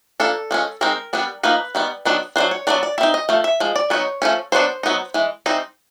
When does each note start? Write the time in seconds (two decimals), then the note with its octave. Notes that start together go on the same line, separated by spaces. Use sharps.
0.20 F3 A#3 D4 A4
0.51 F3 G#3 C#4
0.81 D#3 G#3 C4 D#4 A#4
1.13 G3 B3 D4
1.43 F3 A#3 D#4 B4
1.75 D#3 G3 B3
2.05 D#3 F#3 B3 D4
2.36 F#3 A3 D4 C5
2.51 C#5
2.67 F#3 B3 D4 D5
2.83 D5
2.98 G3 E5
3.01 C4 D#4
3.14 D#5
3.29 F3 A3
3.44 E5
3.60 F3 G#3
3.76 D5
3.90 F#3 B3 D#4 C#5
4.22 F3 A3 C#4
4.52 F#3 B3 D4 C5
4.83 F#3 B3 D#4
5.14 E3 G#3
5.46 E3 G3 C4 D#4